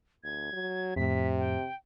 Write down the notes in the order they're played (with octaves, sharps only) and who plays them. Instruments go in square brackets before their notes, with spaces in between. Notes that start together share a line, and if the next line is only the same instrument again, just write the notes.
[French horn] D2 [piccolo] G#6
[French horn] F#3
[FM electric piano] F2 A2 [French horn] C3 [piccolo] B6
[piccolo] G5